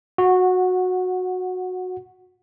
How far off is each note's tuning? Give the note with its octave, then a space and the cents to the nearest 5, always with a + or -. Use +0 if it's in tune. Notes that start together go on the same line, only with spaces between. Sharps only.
F#4 -15 F#5 +0